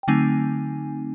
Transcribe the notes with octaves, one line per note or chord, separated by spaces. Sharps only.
G5
D3 F#3 A3 C4 D#4 G#5